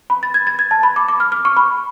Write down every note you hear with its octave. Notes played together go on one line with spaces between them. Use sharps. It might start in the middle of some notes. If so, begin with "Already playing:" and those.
B5
A6
G#6
A6
G#6
A5
B5
D6
D6
F6
F6
C#6
B5